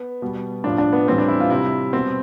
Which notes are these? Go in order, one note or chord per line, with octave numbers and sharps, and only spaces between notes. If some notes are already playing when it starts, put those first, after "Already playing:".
Already playing: B3
B2 G3
A2 F3 D4
D4
B3
A2 E3 G3 C4
D4
E4
F4
C3 G3 E4
B2 G3 C4